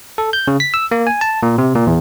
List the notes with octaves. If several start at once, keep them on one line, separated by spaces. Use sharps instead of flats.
A4
G6
C#3
B6
E6
A#3
G#5
A5
A#2
C3
A#2
E2